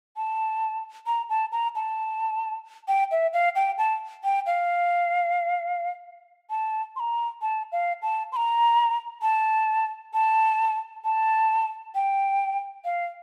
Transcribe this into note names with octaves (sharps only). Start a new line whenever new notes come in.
A5
A#5
A5
A#5
A5
G5
E5
F5
G5
A5
G5
F5
A5
C6
A#5
A5
F5
A5
C6
A#5
A5
A5
A5
G5
F5